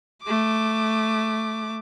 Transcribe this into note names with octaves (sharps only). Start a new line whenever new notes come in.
A3 D6